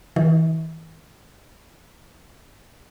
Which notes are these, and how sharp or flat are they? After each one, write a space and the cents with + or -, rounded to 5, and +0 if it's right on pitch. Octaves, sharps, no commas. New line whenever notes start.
E3 -40